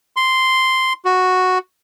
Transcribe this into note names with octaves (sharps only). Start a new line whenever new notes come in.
C6
F#4